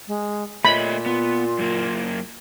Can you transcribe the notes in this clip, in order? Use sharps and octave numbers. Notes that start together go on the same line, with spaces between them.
G#3
A#2 A3 C#5 D#5 B5
B3 F4
F#2 A#3